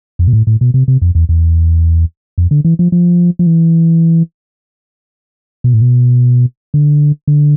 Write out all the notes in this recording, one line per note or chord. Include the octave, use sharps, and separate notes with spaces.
F2
B2
A2
A2
B2
C3
C3
F2
E2
E2
F2
D3
E3
F3
F3
F3
E3
B2
A2
B2
D3
D3